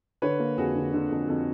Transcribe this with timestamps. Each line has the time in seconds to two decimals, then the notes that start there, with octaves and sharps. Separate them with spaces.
0.22 D3 B4 C#5
0.39 A#3
0.57 F2 F#4 G#4
0.75 D3
0.93 D3
1.11 F2
1.28 F2